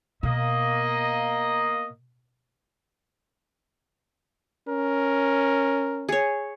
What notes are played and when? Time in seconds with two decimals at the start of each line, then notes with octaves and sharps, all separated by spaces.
0.23 B2 A#3 D#5
4.68 C#4 A#4
6.09 G#4 C#5